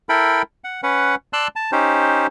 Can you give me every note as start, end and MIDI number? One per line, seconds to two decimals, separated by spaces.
0.09 0.42 64
0.09 0.42 69
0.09 0.42 70
0.09 0.42 79
0.09 0.42 83
0.64 0.81 78
0.83 1.15 61
0.83 1.15 71
0.83 1.15 78
1.33 1.48 74
1.33 1.48 81
1.33 1.48 84
1.33 1.48 88
1.33 1.48 90
1.56 1.71 81
1.72 2.27 61
1.72 2.27 63
1.72 2.27 67
1.72 2.27 72